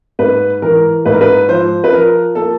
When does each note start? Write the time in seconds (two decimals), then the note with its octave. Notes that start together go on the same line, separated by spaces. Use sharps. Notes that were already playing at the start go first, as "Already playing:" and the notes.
0.19 G#2 B4
0.62 E3 A#4
1.06 G#2 B4
1.13 A#4
1.21 B4
1.49 F3 C5
1.84 B4
1.92 F3 A#4
2.35 A#3 A4